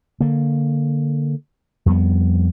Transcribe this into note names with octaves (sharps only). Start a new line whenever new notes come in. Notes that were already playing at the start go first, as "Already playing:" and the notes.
D3 A#3
F2 G3 A#3 B3